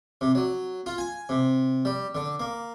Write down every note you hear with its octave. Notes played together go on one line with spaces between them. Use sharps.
C3
F#3
F4
G#5
C3
G3
D3
A#3